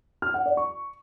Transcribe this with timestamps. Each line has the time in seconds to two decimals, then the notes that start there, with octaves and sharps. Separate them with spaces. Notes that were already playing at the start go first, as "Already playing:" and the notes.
0.22 F6
0.34 F#5
0.46 D5
0.57 C#6